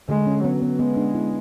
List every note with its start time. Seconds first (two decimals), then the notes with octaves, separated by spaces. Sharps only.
0.09 D3 G#3
0.27 C#4
0.44 F#3 B3
0.62 B3
0.79 G#3 B3
0.97 D4
1.14 E4